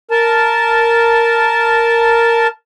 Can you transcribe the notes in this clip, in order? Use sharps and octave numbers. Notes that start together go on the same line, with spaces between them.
A#4 A5